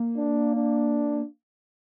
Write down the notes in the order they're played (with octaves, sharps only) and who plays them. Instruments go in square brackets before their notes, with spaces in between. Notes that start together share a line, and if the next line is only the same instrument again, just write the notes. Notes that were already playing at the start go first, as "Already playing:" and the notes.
Already playing: [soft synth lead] A#3
[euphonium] D4
D4